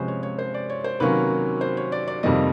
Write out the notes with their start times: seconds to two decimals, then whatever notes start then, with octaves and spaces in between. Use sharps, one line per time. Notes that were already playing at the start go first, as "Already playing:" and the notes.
Already playing: C3 F3 G#3 C#4 B4 C5
0.08 C#5
0.23 C#5
0.39 C5
0.54 D5
0.70 C#5
0.84 C5
1.00 C3 D#3 F#3 A#3 C#4 B4
1.61 C5
1.77 C#5
1.92 D5
2.08 D5
2.23 F2 C3 D#3 G3 A#3 D#5